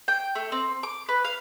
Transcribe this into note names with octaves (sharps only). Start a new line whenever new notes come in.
G5
A3
C4
D6
B4
F5